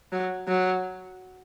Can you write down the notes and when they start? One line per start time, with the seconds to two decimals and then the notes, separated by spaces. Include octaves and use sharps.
0.12 F#3
0.48 F#3